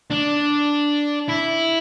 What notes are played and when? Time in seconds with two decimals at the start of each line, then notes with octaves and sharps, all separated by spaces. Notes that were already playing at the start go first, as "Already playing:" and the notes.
0.10 D4
1.29 E4